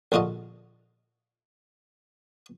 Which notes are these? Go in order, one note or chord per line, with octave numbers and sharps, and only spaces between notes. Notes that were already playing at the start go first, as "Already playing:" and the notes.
A#1 D3 F4 F#4 D#5